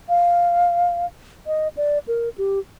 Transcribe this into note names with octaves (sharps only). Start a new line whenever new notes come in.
F5
D#5
D5
A#4
G4